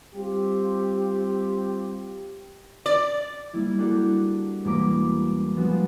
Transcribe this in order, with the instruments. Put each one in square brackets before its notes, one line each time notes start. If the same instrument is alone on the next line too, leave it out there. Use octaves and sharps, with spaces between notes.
[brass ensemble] G3 C4 F4 G4
[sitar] D5
[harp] G3 A#3 E4
D4 F#4 G4 A4 A#4
E1 G3 A#3 A#5 D6 B6
F3 G#3 B3 F4 F#4